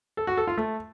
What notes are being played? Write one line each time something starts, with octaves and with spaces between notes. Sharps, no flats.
A4
F#4
A4
F4
A3